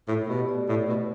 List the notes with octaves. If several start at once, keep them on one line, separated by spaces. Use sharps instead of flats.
A2 A3
B2 G4
D5
A2 A3
B2 A3